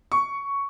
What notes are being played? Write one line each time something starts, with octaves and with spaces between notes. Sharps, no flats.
C#6